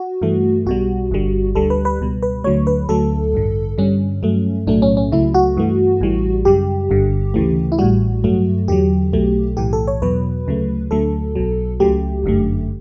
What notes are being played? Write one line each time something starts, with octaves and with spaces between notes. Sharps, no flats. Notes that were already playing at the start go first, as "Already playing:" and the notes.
Already playing: F#4
G2 E3 A3
B1 B2 G3 F#4
G1 G2 D3 G3
D2 D3 G3 A4
B4
B4
C#2 B2 G3
B4
D2 D3 F#3 A3 C#5
B4
D2 D3 F#3 A3 A4
A1 G2 D3
G2 D3 G3 C#4
G2 F#3 A3
B1 A2 F#3 A3 D4
C#4
C#4
C#2 C#3 F#3 A3 E4
F#4
G2 E3 A3
A1 A2 E3 G3
F#2 C#3 G3 G4
G1 G2 D3
D2 C#3 E3 A3
E4
A1 A2 G3 F#4
G2 F#3 A3
E2 D3 F#3 G4
B1 B2 F#3 A3
B1 A2 E3 G4
A4
C#5
E2 B2 F#3 B4
D2 C#3 F#3 A3
D2 D3 F#3 A3 A4
B1 B2 F#3
C#2 C#3 F#3 A3 G4
G1 F#2 D3 A3